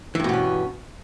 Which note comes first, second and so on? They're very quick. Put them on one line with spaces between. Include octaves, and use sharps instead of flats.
E3 G2 B2 B3 C#4